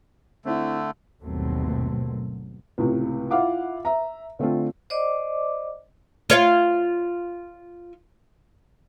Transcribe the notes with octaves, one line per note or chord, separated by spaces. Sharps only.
D3 A3 C4 E4
G1 D#2 B2 F#3 A3 C4
C#2 A2 C3
E4 F4 F5 F#5 D6
E5 A#5
D3 A3 C4 F4
C5 D5 D#5 D6
F4 C#5 F5